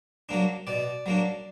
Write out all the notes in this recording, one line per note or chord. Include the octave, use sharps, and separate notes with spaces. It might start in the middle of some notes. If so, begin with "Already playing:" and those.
F#3 A#3 D4
B2 D5
F#3 A#3 D4